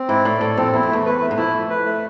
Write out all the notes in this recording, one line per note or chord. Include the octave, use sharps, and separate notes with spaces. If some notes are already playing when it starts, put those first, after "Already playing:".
Already playing: C4
G#2 E4
A2 D5
A2 A4
F2 C4
E2 E4
F2
E2 A3
B4
A3
G#2
F2 E4
A3
B4
A3